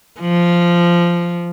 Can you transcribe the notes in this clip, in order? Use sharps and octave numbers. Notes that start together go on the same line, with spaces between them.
F3